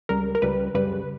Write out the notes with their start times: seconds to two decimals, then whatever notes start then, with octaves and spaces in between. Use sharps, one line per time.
0.09 C#2 C#3 G3 A#4
0.35 A#4
0.42 C#2 C#3 G3 B4
0.75 F#2 C#3 G3 B4